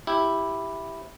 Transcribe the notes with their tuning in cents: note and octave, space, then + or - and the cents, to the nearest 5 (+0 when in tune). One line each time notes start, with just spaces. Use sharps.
E4 +0 G4 +0